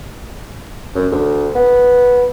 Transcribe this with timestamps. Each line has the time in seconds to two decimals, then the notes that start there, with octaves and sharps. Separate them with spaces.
0.95 F#2
1.12 D2
1.55 B3